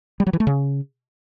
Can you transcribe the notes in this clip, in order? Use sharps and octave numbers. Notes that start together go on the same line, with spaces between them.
G3
F#3
E3
A3
C#3